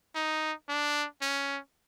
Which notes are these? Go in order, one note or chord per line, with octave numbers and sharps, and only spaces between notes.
D#4
D4
C#4